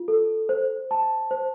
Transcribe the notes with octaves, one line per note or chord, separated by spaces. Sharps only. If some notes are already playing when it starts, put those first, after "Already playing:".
Already playing: F4
A4
C5
A5
C5